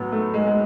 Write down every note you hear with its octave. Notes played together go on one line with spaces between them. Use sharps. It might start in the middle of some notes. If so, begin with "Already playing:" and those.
Already playing: A2 F#3 B3
A3
G#3
G#3